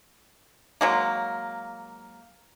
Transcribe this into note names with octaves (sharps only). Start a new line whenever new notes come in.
F#3 G#3 A#3